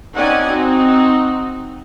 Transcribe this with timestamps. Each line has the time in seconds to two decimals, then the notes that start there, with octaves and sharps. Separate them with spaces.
0.16 C4 C#4 D#4 D5 F#5 G#5
0.47 C4 D#4 F#4